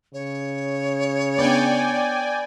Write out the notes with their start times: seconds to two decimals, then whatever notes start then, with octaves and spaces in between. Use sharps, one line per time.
0.14 C#3 C#5
1.38 B3 D4 D5 G5 G#5